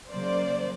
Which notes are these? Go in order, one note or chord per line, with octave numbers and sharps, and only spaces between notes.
C#3 F#3 A#3 C5 D5